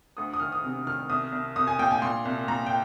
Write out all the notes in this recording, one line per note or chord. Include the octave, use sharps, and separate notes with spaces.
D2 D#6
D#6
D#3 F6
D#6
C3
D#3 F6
C2 D#6
C2
C2 D#6
G#5
A#2 G5
G#5
A#2 C6
C2
A#2 A#5
G5